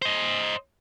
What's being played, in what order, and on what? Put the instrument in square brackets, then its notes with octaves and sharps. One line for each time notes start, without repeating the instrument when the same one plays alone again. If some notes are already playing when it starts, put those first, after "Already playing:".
[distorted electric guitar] C5 D#5